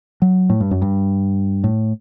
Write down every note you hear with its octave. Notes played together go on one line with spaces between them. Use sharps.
F#3
A2
G2
F#2
G2
A2